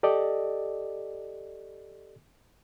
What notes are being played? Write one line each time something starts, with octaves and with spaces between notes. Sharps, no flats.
G4 A4 D5 D#5